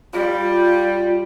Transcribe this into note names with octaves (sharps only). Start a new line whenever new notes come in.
G3 F4